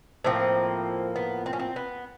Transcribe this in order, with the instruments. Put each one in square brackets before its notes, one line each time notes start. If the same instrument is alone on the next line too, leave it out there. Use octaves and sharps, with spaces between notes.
[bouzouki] A2 F3 A#3 C4
B3
C4
C#4
C4
B3